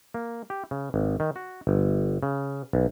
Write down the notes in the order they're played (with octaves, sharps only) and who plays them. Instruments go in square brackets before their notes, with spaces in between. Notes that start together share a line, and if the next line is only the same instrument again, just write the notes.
[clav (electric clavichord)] A#3
G4
C#3
G#1
D#3
F#4
G1
C#3
B1